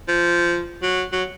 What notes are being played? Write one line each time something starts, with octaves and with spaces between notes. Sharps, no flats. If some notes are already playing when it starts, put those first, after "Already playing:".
F3
F#3
F#3